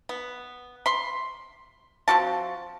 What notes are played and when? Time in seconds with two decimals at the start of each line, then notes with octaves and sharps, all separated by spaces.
0.09 B3
0.86 B5 C6
2.08 F3 C4 F#4 A5